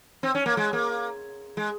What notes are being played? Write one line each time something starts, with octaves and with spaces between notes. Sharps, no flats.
C4
C#4
A#3
G#3
A#3
G#3